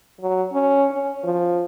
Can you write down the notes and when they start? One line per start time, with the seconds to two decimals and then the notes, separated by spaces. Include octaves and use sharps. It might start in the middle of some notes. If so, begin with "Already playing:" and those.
0.21 F#3
0.52 C#4
0.91 C#4
1.24 F3